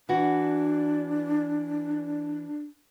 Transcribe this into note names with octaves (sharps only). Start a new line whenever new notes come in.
E3 D4 F#4